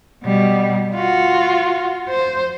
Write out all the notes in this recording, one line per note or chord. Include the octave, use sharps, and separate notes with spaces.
B2 G3
F4 F#4
C5